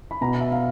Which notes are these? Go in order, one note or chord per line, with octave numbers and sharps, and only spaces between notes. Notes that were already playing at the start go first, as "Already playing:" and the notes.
B5
B2 A#5
E5
F5